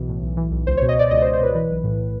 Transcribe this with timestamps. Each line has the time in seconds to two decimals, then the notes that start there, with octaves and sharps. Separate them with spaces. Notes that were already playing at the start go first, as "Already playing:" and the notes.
Already playing: B1 B2 E3
0.09 A2
0.22 B1
0.37 E3
0.51 B1
0.67 C#2 C5
0.77 B2 C#5
0.89 D#5
0.96 B2 D5
1.11 C#2 D#5
1.22 C5
1.26 C#2
1.33 C5
1.40 B2 B4
1.54 E3 B4
1.70 B1
1.84 A2